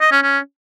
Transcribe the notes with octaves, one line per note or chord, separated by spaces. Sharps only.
D#5
C#4
C#4